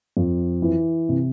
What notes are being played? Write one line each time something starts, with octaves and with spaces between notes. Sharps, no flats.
F2
E3
C3